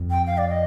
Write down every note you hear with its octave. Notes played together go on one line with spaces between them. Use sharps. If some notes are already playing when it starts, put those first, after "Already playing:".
Already playing: F2
G5
F5
D5
D#5